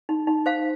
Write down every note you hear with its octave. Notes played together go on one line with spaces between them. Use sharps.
D#4
D#4
C5 F5